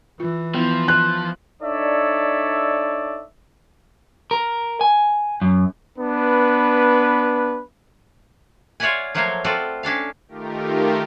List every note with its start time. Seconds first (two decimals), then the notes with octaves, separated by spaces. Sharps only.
0.20 E3 F4
0.55 F3 B3 E4
0.88 F#6
1.63 D4 D#4 A4 C#5 D5 E5
4.31 A#4
4.81 G#5
5.42 F#2
5.98 B3 D4 B4
8.80 F4 C#5 D5 E5 F#5 G#5
9.15 F3 F#3 A3 A#3 C5 C#5
9.44 C4 F4 F#4 A4 D5
9.83 C#4 D4 A4 F5
10.28 D#3 A3 F4 G4 A#4